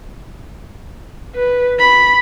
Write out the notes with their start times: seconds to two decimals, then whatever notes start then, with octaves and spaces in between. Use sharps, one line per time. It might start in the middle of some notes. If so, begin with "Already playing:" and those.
1.35 B4
1.79 B5